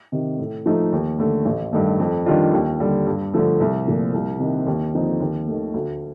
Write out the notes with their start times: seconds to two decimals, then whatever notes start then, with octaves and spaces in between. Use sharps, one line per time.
0.12 C3 D#3
0.38 A2
0.66 F3 A3 D#4
0.92 D#2
1.18 D3 A3
1.45 A1
1.73 G2 D#3 A3
1.99 F2
2.26 D#3 G3 D4 F4
2.53 D#2
2.80 D3 G3
3.06 G2
3.34 D3 F3 A3
3.60 C2
3.87 A#2 F3 A3
4.14 C2
4.40 C3 D#3
4.66 D#2
4.93 D3 F3 C4 D#4
5.20 D#2
5.47 D#3 A3
5.74 D2